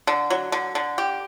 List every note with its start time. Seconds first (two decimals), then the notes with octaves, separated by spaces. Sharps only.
0.07 D3
0.30 F#3
0.52 D3
0.75 D3
0.98 G4